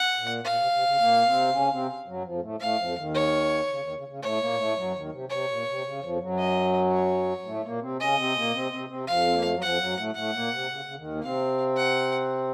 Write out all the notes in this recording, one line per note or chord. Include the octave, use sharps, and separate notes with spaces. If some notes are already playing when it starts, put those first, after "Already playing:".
Already playing: F#5
A#2
A#2 F5
C3
C3
C#3
A#2 A#3
C3 C4
C#3 C#4
C3 C4
F#2 F#3
F2 F3
A2 A3
A2 A3 F5
F2 F3
D#2 D#3
C#5
C#3
D#2 D#3
C#3
C#3
A2 A3 C#5
A#2 A#3
A2 A3
F#2 F#3
D#2 D#3
C3
C3 C#5
A#2
C3
C#3
F2 F3
F#2 F#3
D#5
C#5
A2 A3
A#2 A#3
C3 C4
C#3 C#4 D#5
C3 C4
A#2 A#3
C3 C4
C3 C4
C3 C4
F2 F3 F5
C4
A#3
A3
F#3
F2 F3 F#5
F#2 F#3
A2 A3
A2 A3 F#5
A#2 A#3
C3
C#3
C#3
D#2 D#3
A#3
C3 C4 F5
F#5